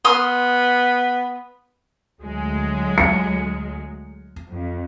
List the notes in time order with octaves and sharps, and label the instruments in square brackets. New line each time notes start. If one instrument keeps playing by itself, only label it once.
[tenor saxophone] B3 [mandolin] C6 D#6 F6
[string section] D2 F#3 G#3
[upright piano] C#7
[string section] F2